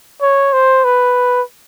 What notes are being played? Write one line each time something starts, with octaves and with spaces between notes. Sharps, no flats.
C#5
C5
B4